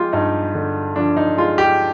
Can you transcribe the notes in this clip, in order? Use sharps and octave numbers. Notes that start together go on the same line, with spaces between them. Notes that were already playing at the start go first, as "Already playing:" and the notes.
Already playing: F3 G#3 F4 G4
G2 D#4
D3
F3 D4
D#4
G#3 F4
G4